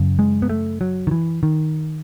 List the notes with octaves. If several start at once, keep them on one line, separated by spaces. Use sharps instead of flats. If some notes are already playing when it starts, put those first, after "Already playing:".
Already playing: F#2 C#3
G#3
B3
A3
F#3
D#3
E3
D#3